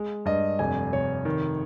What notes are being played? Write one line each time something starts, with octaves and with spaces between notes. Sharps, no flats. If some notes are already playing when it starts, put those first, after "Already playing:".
Already playing: G#3
G2 D#5
F1 G#5
F1 C#5
D#3